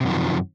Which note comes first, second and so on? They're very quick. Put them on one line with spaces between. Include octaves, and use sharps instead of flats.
C3 F#2 D#3 F3